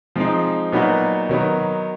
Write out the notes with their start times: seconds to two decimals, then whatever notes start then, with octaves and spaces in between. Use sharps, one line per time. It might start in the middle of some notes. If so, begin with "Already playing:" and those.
0.16 F3 G#3 C4 D#4
0.72 A#2 F#3 B3 D#4 F#4
1.29 D#3 F#3 B3 D#4